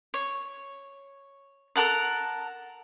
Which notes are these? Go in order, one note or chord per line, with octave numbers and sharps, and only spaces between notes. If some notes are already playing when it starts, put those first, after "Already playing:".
C#5
A4 A#4 F#5 A5